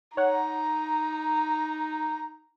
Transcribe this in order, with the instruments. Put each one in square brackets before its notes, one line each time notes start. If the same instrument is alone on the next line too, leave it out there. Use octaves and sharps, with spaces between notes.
[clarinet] D#4 [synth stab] C#5 F#5 [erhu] A#5